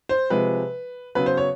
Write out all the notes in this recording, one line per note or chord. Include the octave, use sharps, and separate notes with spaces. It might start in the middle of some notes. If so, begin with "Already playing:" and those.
C5
C3 F3 G#3 B4
C#3 F#3 B3 B4
C5
C#5